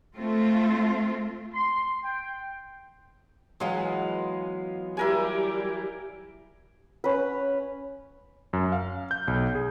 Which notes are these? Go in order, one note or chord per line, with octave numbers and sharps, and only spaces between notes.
A3 C4 F4
C6
G5
E3 F#3 G#3 B3 F4 F5
G3 E4 G4 A#4 G#5
C#4 B4
F#2
F5
G6
B1
G#4